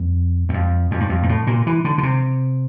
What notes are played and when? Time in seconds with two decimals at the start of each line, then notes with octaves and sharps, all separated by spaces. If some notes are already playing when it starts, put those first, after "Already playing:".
Already playing: F2
0.49 E2
0.54 F2
0.91 F2
1.00 G2
1.09 F2
1.23 G2
1.29 A2
1.47 A#2
1.67 E3
1.85 D3
1.98 D3
2.03 C3